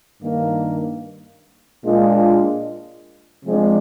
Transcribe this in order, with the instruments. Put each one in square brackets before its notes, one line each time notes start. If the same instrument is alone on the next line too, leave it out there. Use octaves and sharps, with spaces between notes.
[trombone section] G2 D#3 A#3
A#2 G#3 D4 F4
C3 F3 G#3 D4